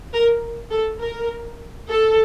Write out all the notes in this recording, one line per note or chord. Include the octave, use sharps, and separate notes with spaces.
A#4
A4
A#4
A4